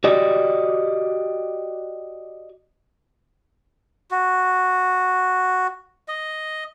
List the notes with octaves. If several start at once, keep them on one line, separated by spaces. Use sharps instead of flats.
F#4 G4 D5 D#5
F#4
D#5